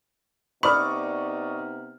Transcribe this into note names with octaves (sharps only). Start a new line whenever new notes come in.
C3 B3 D#4 D5 B5 C#6 D#6 F6